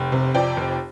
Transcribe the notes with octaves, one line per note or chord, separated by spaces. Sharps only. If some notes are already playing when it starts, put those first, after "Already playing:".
Already playing: F1 G5
C3
F2 D5 G5
F1